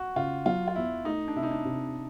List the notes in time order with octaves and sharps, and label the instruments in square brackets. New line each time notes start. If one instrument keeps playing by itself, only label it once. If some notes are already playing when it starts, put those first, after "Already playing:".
Already playing: [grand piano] F#4
[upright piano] C#3 [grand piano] F4
[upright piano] F#3 [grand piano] F4
[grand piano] F4
[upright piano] E2 [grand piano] E4
[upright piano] A3 [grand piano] D#4
[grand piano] D4
[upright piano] C3 [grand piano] E4
[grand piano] D#4
D4
[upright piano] C3